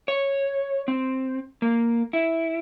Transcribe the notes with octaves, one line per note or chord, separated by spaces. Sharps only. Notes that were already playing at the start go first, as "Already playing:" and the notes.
C#5
C4
A#3
E4